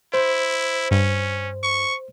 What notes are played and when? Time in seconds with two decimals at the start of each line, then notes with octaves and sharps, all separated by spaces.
0.14 E4 C5
0.91 G2 C#4
1.63 C#6